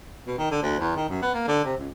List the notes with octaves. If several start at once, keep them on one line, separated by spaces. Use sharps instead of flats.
B2
D#3
D3
D2
E2
D#3
F#2
B3
A#3
D3
C3
C#2